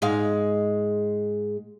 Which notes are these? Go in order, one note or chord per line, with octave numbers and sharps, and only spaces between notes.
G#2 G#3 F5